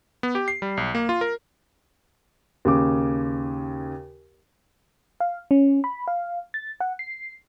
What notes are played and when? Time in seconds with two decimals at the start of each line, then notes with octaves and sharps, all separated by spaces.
0.23 B3
0.35 G4
0.48 C7
0.62 G3
0.77 B1
0.95 A#3
1.09 F4
1.21 A#4
2.65 D#2 C#3 D6
5.20 F5
5.51 C#4
5.84 B5
6.08 F5
6.54 A6
6.80 F#5
6.99 C7